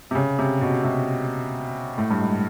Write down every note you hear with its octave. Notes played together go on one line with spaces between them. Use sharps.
C3
C#3
C3
B2
C3
A2
G2
G#2